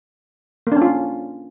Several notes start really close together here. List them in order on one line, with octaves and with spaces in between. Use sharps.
A#3 D4 C#4 F4